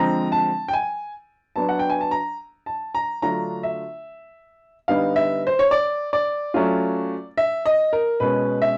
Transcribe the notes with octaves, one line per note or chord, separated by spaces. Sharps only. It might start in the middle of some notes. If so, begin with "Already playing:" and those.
Already playing: D3 F3 G#3 C4 A#5
A5
G5
G#5
F#3 B3 D4 A5
F#5
G5
G#5
A5
A#5
A5
A#5
D3 F#3 A3 D4 F4 A#5
E5
D3 G3 B3 D#4 F5
E5
C5
C#5
D5
D5
F#3 A3 C#4 F4
E5
D#5
A#4
B2 G#3 C#4 B4
E5